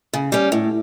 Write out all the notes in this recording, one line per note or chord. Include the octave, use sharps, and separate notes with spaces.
C#3
G3 C#4
A2